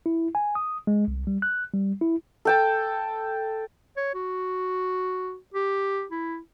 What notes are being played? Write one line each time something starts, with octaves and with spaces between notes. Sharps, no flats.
E4
G#5
D#6
G#3
C2
G3
F#6
G3
E4
A4 G5 A5
C#5
F#4
G4
E4